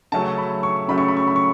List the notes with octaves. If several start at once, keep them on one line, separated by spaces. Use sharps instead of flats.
C#3 F#3 A3 C#4 A5
B5
C#6
C#3 F#3 A3 C#4 B5
C#6
B5
C#6
B5
C#6